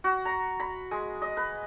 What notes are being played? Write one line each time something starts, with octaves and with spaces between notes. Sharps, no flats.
F#4
A#5
B5
G#3
D#5
B4